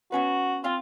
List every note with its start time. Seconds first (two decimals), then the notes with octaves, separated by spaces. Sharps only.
0.12 B3 C#4 F#4 B4
0.64 C4 F4 F5 C6